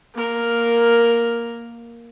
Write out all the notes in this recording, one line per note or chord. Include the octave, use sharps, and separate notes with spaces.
A#3 A#4